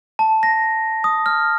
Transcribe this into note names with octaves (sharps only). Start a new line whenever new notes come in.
A5
A#6
D#6
F6